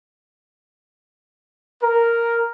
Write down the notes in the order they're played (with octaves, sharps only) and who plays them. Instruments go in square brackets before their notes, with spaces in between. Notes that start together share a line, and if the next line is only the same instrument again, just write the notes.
[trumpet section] A#4